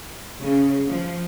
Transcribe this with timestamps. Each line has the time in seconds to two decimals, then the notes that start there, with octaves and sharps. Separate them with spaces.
0.41 C#3
0.90 F3